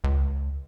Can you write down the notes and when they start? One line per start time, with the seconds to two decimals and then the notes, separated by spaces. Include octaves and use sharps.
0.04 C#2